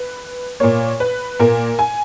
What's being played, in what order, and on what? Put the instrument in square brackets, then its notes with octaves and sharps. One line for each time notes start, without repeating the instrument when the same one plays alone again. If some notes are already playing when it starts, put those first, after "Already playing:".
Already playing: [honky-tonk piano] B4
A#2 A#3 C#5
B4
A#2 A#3 A#4
G#5